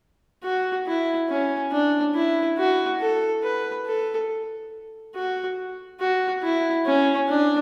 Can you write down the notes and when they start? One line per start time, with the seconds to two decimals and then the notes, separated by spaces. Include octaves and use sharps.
0.44 F#4
0.87 E4
1.29 C#4
1.72 D4
2.15 E4
2.57 F#4
3.00 A4
3.43 B4
3.86 A4
5.15 F#4
6.00 F#4
6.42 E4
6.86 C#4
7.28 D4